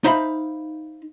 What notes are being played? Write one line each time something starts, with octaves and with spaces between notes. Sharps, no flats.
D#4 C5 E5 F5 B5